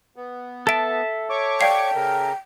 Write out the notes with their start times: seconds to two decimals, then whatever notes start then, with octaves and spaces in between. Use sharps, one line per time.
0.16 B3
0.67 A4 E5 A5 A6 D7
1.30 C#5 C#6 D6
1.61 D5 F5 G5 C7
1.95 C#3 A#4